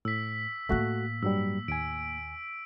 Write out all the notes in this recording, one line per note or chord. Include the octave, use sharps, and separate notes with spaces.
A2 E6 B6
A2 A3 A#3 F#4 F#6
G2 F#3 G3 E6
D#2 G#5 D7